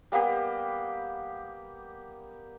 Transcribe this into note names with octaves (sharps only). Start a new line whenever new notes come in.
G3 A#3 B3 G4